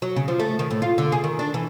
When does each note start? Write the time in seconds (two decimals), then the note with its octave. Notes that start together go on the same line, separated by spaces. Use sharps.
0.02 F#3
0.16 C#3
0.28 F3
0.39 A3
0.59 D#3
0.71 A2
0.82 F4
0.98 D3
1.12 G#4
1.24 D#3
1.39 D4
1.54 E3